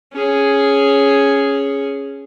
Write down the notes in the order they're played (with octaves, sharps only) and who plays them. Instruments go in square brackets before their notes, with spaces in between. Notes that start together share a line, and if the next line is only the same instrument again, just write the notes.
[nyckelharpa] C#4 G#4